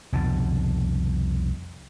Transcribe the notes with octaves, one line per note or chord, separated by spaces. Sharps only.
C2 F2 B2 D3